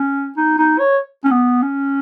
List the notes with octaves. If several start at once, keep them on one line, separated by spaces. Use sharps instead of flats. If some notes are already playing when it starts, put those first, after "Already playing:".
Already playing: C#4
D#4
D#4
C#5
C#4
B3
C#4